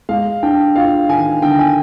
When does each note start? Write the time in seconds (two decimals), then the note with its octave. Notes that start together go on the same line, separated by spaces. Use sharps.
0.09 G#3 F5
0.43 D4 G5
0.76 F4 F5
1.09 D#3 G#5
1.42 D3 G5
1.59 G#5